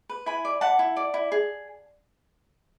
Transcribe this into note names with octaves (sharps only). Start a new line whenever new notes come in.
B4
E4 G#5 B5
D5
E4 F#5 A5
E4
D5
E4
G#4